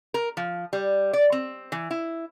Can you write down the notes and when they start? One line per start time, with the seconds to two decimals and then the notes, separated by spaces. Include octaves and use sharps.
0.14 A#4
0.37 F3
0.73 G3
1.13 D5
1.32 C4
1.72 E3
1.91 E4